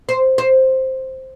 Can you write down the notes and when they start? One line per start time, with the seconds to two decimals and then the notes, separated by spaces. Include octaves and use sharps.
0.09 C5
0.38 C5